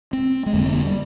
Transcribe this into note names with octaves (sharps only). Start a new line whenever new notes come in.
C4
G#3
F1 F2 D3 A#3
C4
A#3
G3